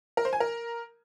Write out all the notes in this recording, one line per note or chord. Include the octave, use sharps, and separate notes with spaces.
A#4
C5
G#5
A#4